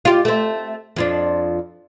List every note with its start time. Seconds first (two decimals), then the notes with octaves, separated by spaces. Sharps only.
0.05 F4 G4
0.25 A3 C4
0.96 F2 F3 D4